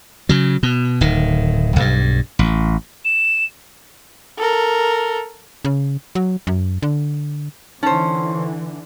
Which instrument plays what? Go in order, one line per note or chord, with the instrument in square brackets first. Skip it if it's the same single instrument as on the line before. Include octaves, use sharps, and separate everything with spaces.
[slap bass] C#3 F#3
B2
D1 D#3
B1 G2
A1
[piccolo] E7
[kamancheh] A4 A#4
[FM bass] C#3
F#3
F#2
D3
[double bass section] D3 E3 [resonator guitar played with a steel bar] C#4 C5 [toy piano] D#4